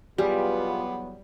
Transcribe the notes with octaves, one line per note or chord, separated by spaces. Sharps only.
E2 B2 F#3 G3 B3 F4 G4 G#4